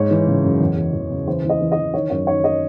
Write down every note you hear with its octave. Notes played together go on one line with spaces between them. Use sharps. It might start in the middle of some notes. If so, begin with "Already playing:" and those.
Already playing: G#2 G#3 C#5
E3
C#3
F#2
E2
E2
E2
C#3
E3 C5
E3
D#5
E3
D#5
E3
D#3 C#5
F#2 C#5
D#3 C#5
D#5